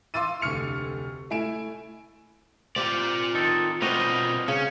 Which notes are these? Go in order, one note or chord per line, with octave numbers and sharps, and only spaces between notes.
F5 C6 D6 E6 A6 D#7
F1 D2 C#6 F6 C#7 F7
A3 E4 G#5 D7 E7
C4 F4 G4 D5
D#3 D#4 A4
B2 G3 C4 F4 F#4 A#4 C5 D#5
C#3 C#4